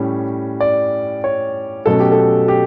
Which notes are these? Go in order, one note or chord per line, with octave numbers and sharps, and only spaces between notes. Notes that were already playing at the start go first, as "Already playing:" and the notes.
Already playing: A2 G3 C#4
D5
C#5
B2 F#3 A3 C#4 A4
G4
A4
G4